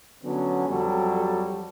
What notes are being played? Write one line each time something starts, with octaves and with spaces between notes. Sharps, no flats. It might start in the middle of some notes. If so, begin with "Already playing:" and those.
D3 F#3 B3 C#4
F2 F#3 G3 A4